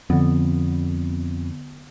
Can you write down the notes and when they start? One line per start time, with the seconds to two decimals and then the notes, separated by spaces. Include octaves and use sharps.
0.10 F2 D3 B3